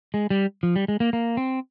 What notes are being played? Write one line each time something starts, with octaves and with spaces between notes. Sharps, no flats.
G#3
G3
F3
G3
G#3
A#3
A#3
C4